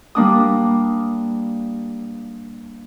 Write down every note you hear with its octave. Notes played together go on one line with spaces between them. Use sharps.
G3 A#3 D4 D#6